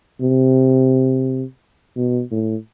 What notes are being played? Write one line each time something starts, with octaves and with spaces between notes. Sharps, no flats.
C3
B2
A2